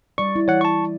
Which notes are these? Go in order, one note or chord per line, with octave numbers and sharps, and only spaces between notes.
G3 D5 C#6
E4
E3 C#5 F#5
A5 C#6